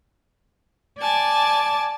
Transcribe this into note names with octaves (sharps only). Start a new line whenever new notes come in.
D5 G#5 A5 D6